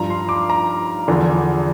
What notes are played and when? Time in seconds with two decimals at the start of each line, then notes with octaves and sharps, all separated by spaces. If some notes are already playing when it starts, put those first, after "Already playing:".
Already playing: G2 F3 A#5
0.10 C6
0.29 D6
0.50 A#5
1.08 E2 D3 F3